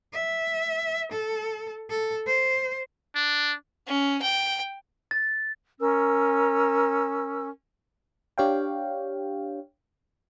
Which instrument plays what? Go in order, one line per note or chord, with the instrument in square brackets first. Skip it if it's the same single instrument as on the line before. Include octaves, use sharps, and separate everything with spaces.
[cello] E5
A4
A4
C5
[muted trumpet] D4
[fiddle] C#4
G5
[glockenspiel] A6
[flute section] C#4 A#4 E6
[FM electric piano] D4 G4 C#5 F5 G5